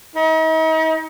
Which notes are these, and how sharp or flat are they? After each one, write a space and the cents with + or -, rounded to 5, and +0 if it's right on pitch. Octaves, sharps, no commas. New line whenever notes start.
D#4 +40